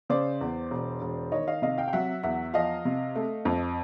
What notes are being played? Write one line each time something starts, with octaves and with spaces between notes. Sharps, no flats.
C#3 C5 D5
E2
E1
E1
D#3 C#5 D#5
D#5 F5
C3 D#5 F5
F5 G5
G5
F#3 E5 F#5
E2 E5 F#5
F3 D#5 F5
C3
A3
F2